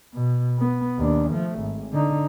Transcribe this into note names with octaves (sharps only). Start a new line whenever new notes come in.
B2
B3
D#2 D4
F3 A3
G#1
D3 D#4